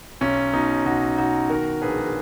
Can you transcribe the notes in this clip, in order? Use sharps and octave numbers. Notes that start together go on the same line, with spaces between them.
B1 C#4
B2 D#4
B1 D#4 F#4
B2 D#4 F#4
D#3 F#4 A#4
A#1 G#4 B4